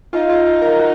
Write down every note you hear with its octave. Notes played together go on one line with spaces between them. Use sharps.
D#4 F4
F4
F4
A#4
F#4